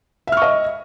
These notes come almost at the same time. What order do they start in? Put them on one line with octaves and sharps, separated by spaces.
E5 F6 C#6 D#5